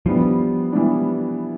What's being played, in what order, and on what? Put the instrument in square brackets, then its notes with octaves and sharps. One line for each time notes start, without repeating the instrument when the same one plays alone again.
[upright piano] E3 G3 B3 D4 [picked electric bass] F3
[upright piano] E3 G3 B3 D4